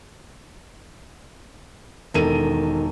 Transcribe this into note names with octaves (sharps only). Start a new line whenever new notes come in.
E1 D#3 A4 D#7